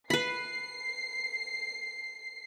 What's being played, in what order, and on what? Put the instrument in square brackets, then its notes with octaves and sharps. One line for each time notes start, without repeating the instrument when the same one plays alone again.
[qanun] B4 B5 [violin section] C7